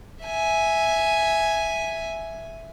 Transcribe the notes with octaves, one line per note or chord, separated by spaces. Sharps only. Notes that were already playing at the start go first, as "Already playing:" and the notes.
E5 G#5